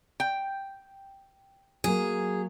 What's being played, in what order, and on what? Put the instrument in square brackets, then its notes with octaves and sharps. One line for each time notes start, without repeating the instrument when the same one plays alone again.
[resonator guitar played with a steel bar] G5
[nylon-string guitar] F#3 A#3 [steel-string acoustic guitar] G#4